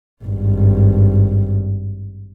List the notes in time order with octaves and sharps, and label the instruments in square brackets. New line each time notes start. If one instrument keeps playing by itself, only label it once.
[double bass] G#1 G2